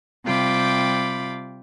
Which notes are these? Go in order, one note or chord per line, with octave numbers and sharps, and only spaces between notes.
C3 G3 F4 G5 B5 D6